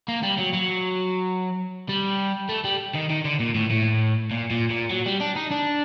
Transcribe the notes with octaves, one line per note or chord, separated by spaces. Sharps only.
A#3
G3
F#3
F#3
G3
A3
G3
D#3
D#3
D3
A#2
A2
A2
A#2
A#2
A#2
F#3
G3
D4
D#4
D4